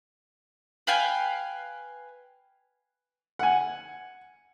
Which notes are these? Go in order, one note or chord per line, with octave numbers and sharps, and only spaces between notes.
B4 F5 G5 G#5
F#5 G#5